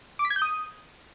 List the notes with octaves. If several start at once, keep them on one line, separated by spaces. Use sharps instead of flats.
D6
B6
G#6
G6
D#6